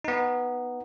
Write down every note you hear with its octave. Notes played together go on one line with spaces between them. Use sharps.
B3 D#4